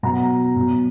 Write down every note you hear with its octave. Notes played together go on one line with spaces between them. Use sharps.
B2 F#3 F#5 A#5
B2 F#3